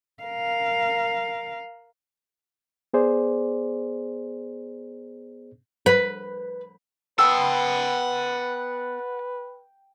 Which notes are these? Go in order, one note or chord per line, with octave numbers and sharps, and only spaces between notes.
A#4 F5
B3 G#4 C5 D5
B4
B3 B4 F#5 G5 A5 C6 E6